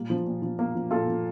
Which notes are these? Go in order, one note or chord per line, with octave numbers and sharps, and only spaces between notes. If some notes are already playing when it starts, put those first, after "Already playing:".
Already playing: A#2 G3 A#3
F3
A#2
F3
A#2 A#3
F3
A#2 F4 A4
F3